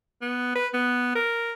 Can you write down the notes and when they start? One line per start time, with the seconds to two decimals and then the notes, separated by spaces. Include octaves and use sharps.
0.21 B3
0.55 B4
0.73 B3
1.15 A#4